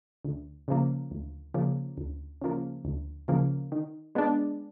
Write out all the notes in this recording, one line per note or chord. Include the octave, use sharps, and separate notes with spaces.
D2
C#3 F3 A#3
D2
C#3 F3 A#3
D2
C#3 F3 A#3
D2
C#3 F3 A#3
D#3
G#3 B3 D4